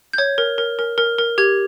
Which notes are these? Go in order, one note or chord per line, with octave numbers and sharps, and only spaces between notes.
G6
C#5 G#6
A#4
A#4
A#4
A#4
A#4
G4 G#6